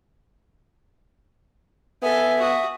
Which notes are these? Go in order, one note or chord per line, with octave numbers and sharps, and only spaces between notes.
B3 A4 E5 G#5
F#4 D#6